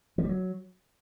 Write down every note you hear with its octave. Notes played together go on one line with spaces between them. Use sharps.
F3
G3
F#3